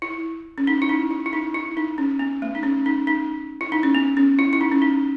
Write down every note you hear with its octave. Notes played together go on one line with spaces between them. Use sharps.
E4
C#4
D#4
E4
D#4
E4
E4
D#4
E4
D#4
C#4
B3
A3
D#4
C#4
D#4
D#4
E4
D#4
C#4
B3
C#4
E4
E4
D#4
C#4
D#4